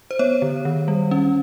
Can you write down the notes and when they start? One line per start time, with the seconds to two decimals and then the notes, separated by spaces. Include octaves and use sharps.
0.11 C5
0.19 B3 C#5
0.42 D3
0.65 D#3
0.88 G3
1.11 C#4